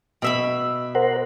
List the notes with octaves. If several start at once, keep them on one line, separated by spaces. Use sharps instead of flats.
B2 E5 B5
A#4 C5 F#5